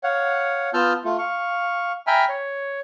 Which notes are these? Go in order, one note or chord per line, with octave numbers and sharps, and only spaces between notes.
C#5 F5 F#5
B3 F4 A5 E6 F6 G6
A3 F4
F5 C#6
E5 G5 G#5 A#5 B5 F6
C#5